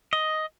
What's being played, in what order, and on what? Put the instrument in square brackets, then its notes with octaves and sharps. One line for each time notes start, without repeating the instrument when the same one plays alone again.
[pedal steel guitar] D#5